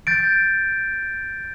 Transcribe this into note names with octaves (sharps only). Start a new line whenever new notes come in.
G6 A6 D7